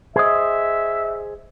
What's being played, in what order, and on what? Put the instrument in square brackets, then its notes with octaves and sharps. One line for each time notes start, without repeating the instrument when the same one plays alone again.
[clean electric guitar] G#4 C5 D#5 [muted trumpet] E5